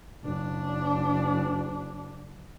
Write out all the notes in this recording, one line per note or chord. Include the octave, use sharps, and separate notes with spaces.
F#1 D4